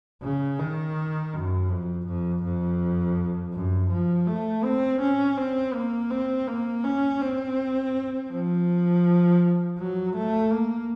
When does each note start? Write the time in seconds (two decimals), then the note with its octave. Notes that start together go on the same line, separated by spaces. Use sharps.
0.23 C#3
0.59 D#3
1.33 F#2
1.70 F2
2.07 F2
2.43 F2
3.54 F#2
3.90 F3
4.27 A3
4.64 C4
5.01 C#4
5.37 C4
5.74 A#3
6.10 C4
6.47 A#3
6.84 C#4
7.21 C4
8.31 F3
9.78 F#3
10.15 A3
10.52 A#3